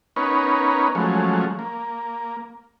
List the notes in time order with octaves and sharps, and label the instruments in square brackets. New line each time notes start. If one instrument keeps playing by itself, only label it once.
[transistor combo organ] B3 C#4 D#4 A#4 B4 C#5
F3 F#3 G#3 A3 C#4
A#3